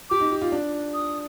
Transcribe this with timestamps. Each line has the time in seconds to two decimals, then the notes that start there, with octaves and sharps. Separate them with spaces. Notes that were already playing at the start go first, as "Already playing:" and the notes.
0.10 G4 D6
0.20 D#4
0.32 G4
0.42 F4
0.52 D4
0.94 D#6